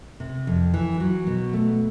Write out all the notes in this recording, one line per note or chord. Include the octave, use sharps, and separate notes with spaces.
C3
F2
E3
F#3
B2
A3